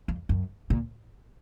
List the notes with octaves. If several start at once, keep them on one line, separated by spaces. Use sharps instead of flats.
F2
F#2
A#2